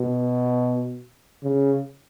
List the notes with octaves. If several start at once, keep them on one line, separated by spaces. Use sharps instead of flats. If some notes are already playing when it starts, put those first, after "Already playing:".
Already playing: B2
C#3